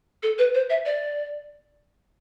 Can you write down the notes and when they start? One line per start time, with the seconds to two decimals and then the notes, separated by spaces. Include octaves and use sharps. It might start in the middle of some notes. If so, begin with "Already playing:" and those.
0.23 A4
0.39 B4
0.54 C5
0.70 E5
0.86 D5